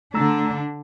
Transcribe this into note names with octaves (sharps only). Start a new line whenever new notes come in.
D3 A3 D4 A#5 E6